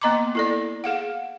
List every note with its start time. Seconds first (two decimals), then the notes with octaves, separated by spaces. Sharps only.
0.01 A#3 B3 D#5 A#5 C6 D6
0.35 E4 A4 D5
0.84 G#4 F5 F#5